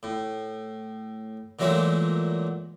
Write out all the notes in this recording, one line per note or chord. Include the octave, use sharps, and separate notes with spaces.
A2
A#2 E3 F#3 G#3 A3